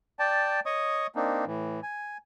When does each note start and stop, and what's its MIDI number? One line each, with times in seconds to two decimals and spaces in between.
0.19 0.60 74
0.19 0.60 79
0.19 0.60 81
0.66 1.07 73
0.66 1.07 75
0.66 1.07 85
0.66 1.07 87
1.15 1.45 58
1.15 1.45 60
1.15 1.45 62
1.15 1.45 63
1.46 1.80 45
1.46 1.80 52
1.83 2.17 80